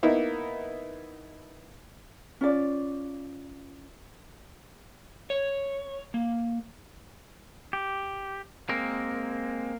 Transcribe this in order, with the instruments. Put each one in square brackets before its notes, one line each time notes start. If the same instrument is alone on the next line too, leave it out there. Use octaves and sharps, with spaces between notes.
[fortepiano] A#3 B3 D#4 E4
[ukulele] C#4 F4 D5
[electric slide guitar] C#5
A#3
[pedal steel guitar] G4
[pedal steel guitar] G#3 C4 A#4 [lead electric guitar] A#3